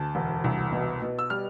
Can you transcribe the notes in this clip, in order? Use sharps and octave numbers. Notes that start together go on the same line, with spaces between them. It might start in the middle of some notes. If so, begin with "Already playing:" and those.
Already playing: D2 A5
E1
C2
B2
B2
E6
G3 F6